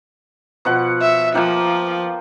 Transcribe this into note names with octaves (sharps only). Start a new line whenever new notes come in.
B2 F3 F#5
E5
F3 A#3 G5